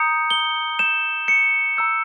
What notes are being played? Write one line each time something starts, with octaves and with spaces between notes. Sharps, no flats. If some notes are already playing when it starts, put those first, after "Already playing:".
Already playing: A#5 D#6 G6 C#7
G7
A#5 D#6 G6 E7
C#7
A#5 E6 G6